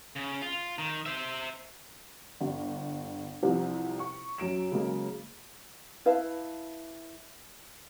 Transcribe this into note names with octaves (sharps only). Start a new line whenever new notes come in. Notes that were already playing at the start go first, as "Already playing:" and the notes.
C#3
F4
D#3
C5 E5
G1
C2 C3 E3 F3
C#6
F#2 F#3 D7 E7
C#3 F#3 G#3 A#3
E4 B4 F5 A5